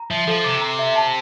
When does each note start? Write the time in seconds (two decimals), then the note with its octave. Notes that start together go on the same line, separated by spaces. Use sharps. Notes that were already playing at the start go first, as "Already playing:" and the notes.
Already playing: A#5
0.10 F3 E5
0.27 F3 A4
0.44 C3 D6
0.61 A#5
0.79 E5
0.96 A5